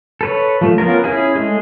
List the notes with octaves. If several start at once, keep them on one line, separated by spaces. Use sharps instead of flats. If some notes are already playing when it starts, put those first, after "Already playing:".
A4 B4 C#5
F3 A3
B3 C#4 F4 A#4
C#4 E4 G#4
G#3 A3 G#4